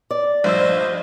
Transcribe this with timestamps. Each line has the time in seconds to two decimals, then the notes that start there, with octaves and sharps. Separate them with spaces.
0.11 D5
0.44 A#1 G2 C5 D#5 E6